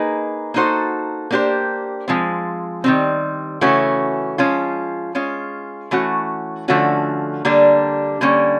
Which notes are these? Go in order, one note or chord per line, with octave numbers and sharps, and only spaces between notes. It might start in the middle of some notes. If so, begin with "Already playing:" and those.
Already playing: A#3 D#4 G#4 B4
A#3 D#4 F#4 A4 C5
A#3 D4 G4 C5
F3 G#3 C4
D#3 G3 C4
C#3 E3 A3 C#4 F#4
F3 G#3 C#4 F4
G#3 C#4 F4
E3 A3 C#4 F#4
D3 F3 A3 C#4 F#4
D3 G3 A#3 D4
D3 G3 A#3 C#4